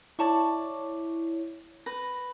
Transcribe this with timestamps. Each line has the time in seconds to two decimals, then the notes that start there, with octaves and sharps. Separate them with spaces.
0.19 E4 C#5 D5 A5 C#6
1.86 B4 A#6